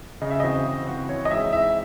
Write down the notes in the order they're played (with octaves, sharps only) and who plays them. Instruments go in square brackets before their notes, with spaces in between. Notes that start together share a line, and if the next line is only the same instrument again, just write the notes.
[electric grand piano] C#3 [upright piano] D#5
[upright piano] E5
[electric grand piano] E3 C4 F#4 C5 [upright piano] D#5
[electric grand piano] C#3
E3 C4 F#4 C5
[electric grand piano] E3 [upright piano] C#5
[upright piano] D#5
[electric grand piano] G#3 C4 D#4 G#4 [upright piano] E5
[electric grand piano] E3 [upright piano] E5